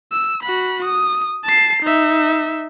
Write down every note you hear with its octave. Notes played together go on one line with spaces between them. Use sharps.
E6
F#4 B5
D#6
A5 C7
D#4 E5